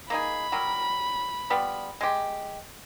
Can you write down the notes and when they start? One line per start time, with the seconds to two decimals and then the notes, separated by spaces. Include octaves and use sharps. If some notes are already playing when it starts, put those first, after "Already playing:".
0.10 A#3 D#4 G#4 B5
0.52 F#3 G3 A#4
1.50 G3 B3 F4
2.01 G#3 G4